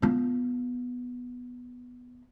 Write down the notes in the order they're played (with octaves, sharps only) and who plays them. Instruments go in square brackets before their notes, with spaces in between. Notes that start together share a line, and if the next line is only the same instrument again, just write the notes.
[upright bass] B3 F4